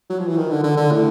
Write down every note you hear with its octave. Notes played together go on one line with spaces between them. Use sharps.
F#3
F3
E3
D#3
D3
D3
D3
A2